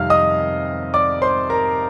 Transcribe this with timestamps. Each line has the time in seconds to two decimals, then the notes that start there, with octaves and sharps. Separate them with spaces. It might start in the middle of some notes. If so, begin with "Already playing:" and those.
Already playing: F2 C3 D#3 G3 F5 F6
0.10 D#5 D#6
0.94 D5 D6
1.22 C5 C6
1.50 A#4 A#5